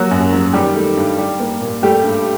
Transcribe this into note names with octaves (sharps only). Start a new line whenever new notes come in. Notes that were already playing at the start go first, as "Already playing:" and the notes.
Already playing: F#3 A#3 F#4
F#2
F#3
D#3 G3 G4
A3
G2
G3
A#3
A#2
G3 A3 G4
G2